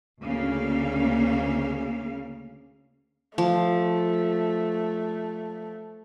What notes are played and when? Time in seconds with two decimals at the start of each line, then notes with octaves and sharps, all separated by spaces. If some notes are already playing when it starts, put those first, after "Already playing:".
0.21 D2 C#3 A#3 F5
3.38 F3 A3